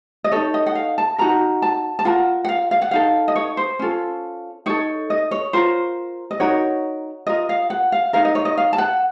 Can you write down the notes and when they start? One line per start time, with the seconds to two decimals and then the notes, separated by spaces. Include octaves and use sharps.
0.24 D#5
0.32 D#4 A4 C#5
0.54 D#5
0.66 F#5
0.75 F5
0.98 A5
1.18 D#4 F#4 A#4 A#5
1.62 A5
1.99 A5
2.05 F4 A#4 F#5
2.45 F#5
2.49 F5
2.71 F5
2.82 F#5
2.91 D#4 A4 F5
3.28 D#5
3.36 C#5
3.57 C5
3.79 C#4 F4 A4
4.66 D#4 A4 C#5
5.10 D#5
5.31 C#5
5.53 F4 A#4 C5
6.31 D#5
6.40 D#4 F#4 A#4 C#5
7.27 F4 A#4 D#5
7.49 F5
7.70 F#5
7.92 F5
8.13 D#4 A#4 F5
8.25 D#5
8.35 C#5
8.45 D#5
8.58 F5
8.73 A5
8.78 F#5